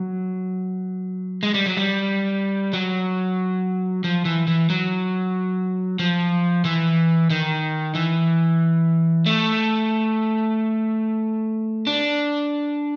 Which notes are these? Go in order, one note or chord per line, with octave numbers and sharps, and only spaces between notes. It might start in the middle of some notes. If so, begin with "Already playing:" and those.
Already playing: F#3
G#3
G3
F#3
G3
F#3
F3
E3
E3
F#3
F3
E3
D#3
E3
A3
D4